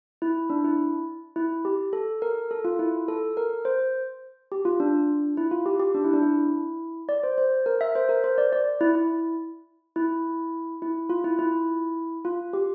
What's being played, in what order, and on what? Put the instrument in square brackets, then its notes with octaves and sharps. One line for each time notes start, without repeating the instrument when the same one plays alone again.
[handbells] E4
D4
E4
E4
G4
A4
A#4
A4
F4
E4
A4
A#4
C5
G4
F4
D4
E4
F4
G4
G4
D4
E4
D4
E4
D5
C5
C5
A#4
E5
C5
A#4
C5
D5
D5
E4
E4
E4
E4
F4
E4
E4
F4
G4